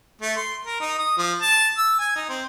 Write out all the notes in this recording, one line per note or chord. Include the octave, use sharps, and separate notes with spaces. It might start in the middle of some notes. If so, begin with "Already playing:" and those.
A3
C6
A#4
D#4
D#6
F3
A5
E6
G#5
D#4
C4